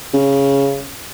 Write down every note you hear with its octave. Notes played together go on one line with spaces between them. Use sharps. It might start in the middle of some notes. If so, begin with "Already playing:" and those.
C#3